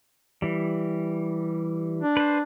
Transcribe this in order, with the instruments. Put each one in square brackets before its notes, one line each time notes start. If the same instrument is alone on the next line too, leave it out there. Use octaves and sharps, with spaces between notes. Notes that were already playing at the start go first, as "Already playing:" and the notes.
[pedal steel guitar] E3 G3
[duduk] D4
[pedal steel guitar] B4 C5